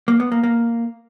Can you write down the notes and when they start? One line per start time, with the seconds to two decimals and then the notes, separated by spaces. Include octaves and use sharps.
0.08 A#3
0.20 B3
0.32 A#3
0.43 A#3